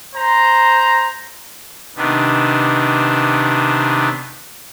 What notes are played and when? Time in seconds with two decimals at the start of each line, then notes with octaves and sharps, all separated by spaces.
0.15 C5 A#5
1.96 C3 D#3 B3 D4